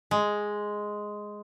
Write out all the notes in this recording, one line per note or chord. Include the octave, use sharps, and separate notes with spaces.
G#3